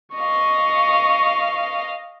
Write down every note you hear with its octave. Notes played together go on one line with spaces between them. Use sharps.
D#5 F5 C#6